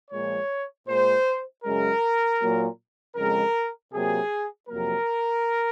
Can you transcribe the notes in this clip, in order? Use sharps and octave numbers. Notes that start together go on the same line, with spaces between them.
A#2 F3 G#3 C#5
A#2 G#3 C5
F#2 C#3 G#3 A#4
A#2 F#3 A#3
F2 C#3 G#3 A#4
C3 F#3 A#3 G#4
F2 C3 F#3 A#3 A#4